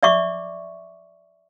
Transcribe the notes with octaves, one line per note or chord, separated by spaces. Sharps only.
D5 E5 C#6 D6